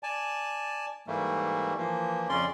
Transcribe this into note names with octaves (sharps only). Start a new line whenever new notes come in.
D5 G#5 A5
G#2 E3 G3 A3 A#3
E3 F3 A#3
F2 C#3 C#4 D5 C6